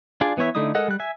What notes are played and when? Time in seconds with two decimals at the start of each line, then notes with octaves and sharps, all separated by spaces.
0.21 D4 F4 G#4 D5
0.37 E3 B3 E4 C#5 E5
0.55 D3 A3 D#4 E4 D#6
0.75 G#3 A4 A#4 D#5 F#5
0.88 G3 F#6
1.00 E5 G#5